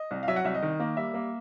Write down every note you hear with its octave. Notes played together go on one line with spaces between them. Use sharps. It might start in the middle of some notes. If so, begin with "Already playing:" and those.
Already playing: D#5
C2
F5
F#3 E5
F#5
C2 E5
D#5
D#3
A#3
G3 E5
A#3